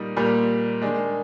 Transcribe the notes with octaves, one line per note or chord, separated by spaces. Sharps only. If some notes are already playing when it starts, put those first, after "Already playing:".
Already playing: A#2 G3 A#3 D#4
A#2 G3 A#3
D#3 G#3 D4